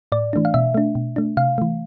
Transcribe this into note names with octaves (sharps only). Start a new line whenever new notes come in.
A2 D5
E3 A3 D4
F5
B2 E5
A3 D4
B2
A3 D4
C3 F5
E3 A3